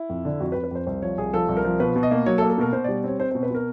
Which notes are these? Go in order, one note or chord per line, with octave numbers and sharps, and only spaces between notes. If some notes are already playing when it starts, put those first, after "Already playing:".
Already playing: E4
F2
D3
F2 F#4
B4
F2
B4
F2 C5
C2 C5
F3 C#5
C2 G#4
F3 A4
C2
A#4
F3
B2 B4
B2
D#5
A#3
F#3 C#5
A4
A#3
A4
B2 A#4
B2 C5
G3 D5
C4 C#5
C4 C5
B2 C5
B4
B2 A#4